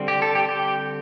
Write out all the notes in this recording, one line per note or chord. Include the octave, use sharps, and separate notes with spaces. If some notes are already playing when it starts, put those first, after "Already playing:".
Already playing: D3 G3 C4
G4
A4
G4
G4